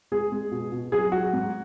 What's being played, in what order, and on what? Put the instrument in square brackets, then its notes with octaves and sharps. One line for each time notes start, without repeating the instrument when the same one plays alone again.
[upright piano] G#3 G#4
G#3
B2
B2
F#3 G#4
F#3 F#4
G#2